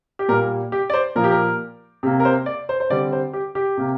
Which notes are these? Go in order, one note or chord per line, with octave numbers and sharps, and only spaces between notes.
G4
A#2 G3 A#3 A#4
G4
D5
C5
A#2 F3 A#3 A#4
G4
A#4
C3 A#3
A#4
C5
D5
C5
C5
D3 G3 C4 D5
C5
G4
G4
C3 A#3